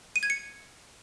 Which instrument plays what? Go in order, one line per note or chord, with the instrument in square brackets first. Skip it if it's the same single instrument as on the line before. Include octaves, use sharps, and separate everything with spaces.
[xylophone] D#7
G#6
C#7